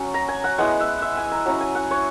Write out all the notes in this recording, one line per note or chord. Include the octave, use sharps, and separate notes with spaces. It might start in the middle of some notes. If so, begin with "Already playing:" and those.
Already playing: F#3 C#4
A#5
G#5
F#5
G#3 B3 E4 F#5
E5
E5
G#5
A#5
F#3 C#4 E4 A#5
G#5
F#5
C#5